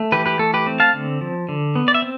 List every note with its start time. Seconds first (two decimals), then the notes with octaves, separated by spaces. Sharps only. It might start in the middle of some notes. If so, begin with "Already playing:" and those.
Already playing: A3
0.12 E3 G4 B4
0.26 G4 B4
0.39 A3 A4
0.54 G4 B4
0.67 C4
0.80 F5 A5
0.94 D3
1.21 F3
1.49 D3
1.76 B3
1.88 D5
1.94 E5
2.02 C4